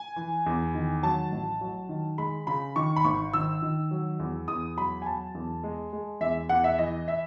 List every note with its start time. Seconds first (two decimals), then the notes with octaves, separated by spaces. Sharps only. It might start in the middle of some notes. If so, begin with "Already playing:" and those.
Already playing: G#5
0.16 E3
0.46 E2
0.74 D#3
1.03 F#3 A5
1.32 A1
1.61 F#3
1.89 D#3
2.18 G#3 B5
2.47 C#3 B5
2.76 D#3 C#6
2.96 B5
3.04 G#1 C#6
3.33 D#3 E6
3.62 D#3
3.91 F#3
4.19 E2
4.48 E2 D#6
4.76 F#3 B5
5.02 G#5
5.05 F#3 A5
5.35 E2
5.64 G#3
5.93 G#3
6.21 E2 E5
6.49 E2 F#5
6.64 E5
6.79 E3 D#5
7.08 E5